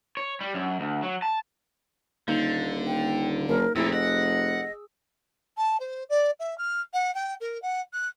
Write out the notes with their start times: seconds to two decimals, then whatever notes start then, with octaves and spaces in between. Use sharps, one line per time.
0.17 C#5
0.41 G3
0.55 F#2
0.80 D2
1.03 F#3
1.22 A5
2.28 D#1 D3 A#3 D#4
2.87 G5
3.49 F#1 A#4
3.76 F1 F2 A#2 E4 G#4 E6
3.93 D#5 F#5
5.57 A5
5.80 C5
6.09 D5
6.39 E5
6.58 F6
6.93 F#5
7.15 G5
7.40 A#4
7.62 F#5
7.93 F#6